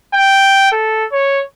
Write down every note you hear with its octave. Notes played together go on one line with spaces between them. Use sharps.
G5
A4
C#5